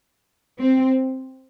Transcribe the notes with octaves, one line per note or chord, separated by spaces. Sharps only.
C4